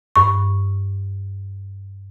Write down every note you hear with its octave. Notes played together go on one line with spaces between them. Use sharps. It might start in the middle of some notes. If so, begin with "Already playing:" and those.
G2 C#6